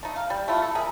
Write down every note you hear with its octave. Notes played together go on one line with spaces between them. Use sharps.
A3 D#4
F5
G3
A3 E4 F4
A4
G#4 A#4 E5